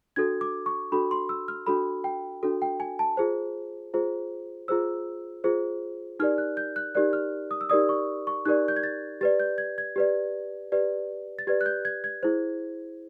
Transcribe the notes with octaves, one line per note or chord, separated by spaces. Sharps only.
D4 F#4 A4 G#6
D6
C#6
D4 F#4 A4 B5
C6
E6
F6
D4 F#4 A4 B5
G5
D4 F#4 A4
G5
G#5
A5
F4 G#4 C5
F4 G#4 C5
F4 G#4 C5 E6
F4 G#4 C5
D#4 G4 A#4 D5 F6
F#6
G6
F#6
D#4 G4 A#4 D5 F#6
F6
D#6
E6
D#4 G4 A#4 D5 D#6
C#6
C#6
D#4 G4 A#4 D5 F#6
G6
G#6
A6
G4 B4 D5 A6
G6
G#6
G#6
G4 B4 D5
G4 B4 D5
A6
G4 B4 D5 G#6
F#6
G6
G#6
G#6
E4 G#4 C5